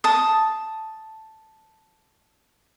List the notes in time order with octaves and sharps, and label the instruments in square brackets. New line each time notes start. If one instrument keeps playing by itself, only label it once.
[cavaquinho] A5 D#6